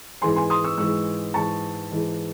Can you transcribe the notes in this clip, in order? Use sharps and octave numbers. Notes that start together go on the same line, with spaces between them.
G#2 E3 G#3 G#5 C6
G#5 C6
C6 D#6
C#6 E6
G#2 E3 G#3 C#6 E6
G#2 E3 G#3 A5 C#6
G#2 E3 G#3